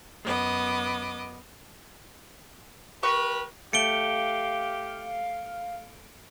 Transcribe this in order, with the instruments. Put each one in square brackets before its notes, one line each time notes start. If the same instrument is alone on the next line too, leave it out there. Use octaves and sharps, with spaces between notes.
[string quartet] F#2 B3 D#5 D6
[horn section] G4 A#4 B4 [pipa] C#6
[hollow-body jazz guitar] A3 [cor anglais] G4 [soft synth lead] F5 [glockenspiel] C#7 D7 G7